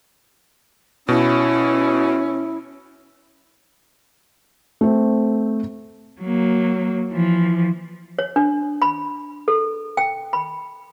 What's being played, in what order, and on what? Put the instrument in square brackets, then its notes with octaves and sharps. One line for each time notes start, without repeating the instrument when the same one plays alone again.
[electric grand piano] B2 [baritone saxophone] C#4 [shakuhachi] E4
[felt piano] A3 C4
[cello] F#3 A#3
E3 F3
[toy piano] C#5
D4
B5
A4
G5
B5